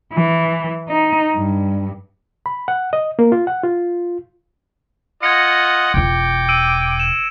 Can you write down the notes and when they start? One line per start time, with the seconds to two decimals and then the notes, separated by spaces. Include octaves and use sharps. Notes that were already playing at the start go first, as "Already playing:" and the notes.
0.13 E3
0.89 D#4
1.36 G2
2.46 B5
2.68 F#5
2.93 D#5
3.19 A#3
3.32 F4
3.47 F#5
3.63 F4
5.23 F4 D#5 F#5 G#6 A#6 C#7
5.94 E1 F4 G5 D6
6.49 E6 D7 D#7
6.99 E7